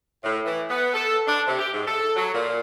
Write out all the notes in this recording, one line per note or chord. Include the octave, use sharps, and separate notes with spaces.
A2
E3
B3
A4
D4
C3
G4
G#2
A4
F#3
A#2